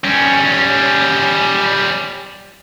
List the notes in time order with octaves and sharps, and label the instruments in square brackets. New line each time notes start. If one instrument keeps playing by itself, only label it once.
[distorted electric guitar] G3 C#4